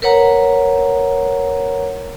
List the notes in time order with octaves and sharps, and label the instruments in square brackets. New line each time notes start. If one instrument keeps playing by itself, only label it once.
[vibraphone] A#4 B4 C#5 F#5 A#5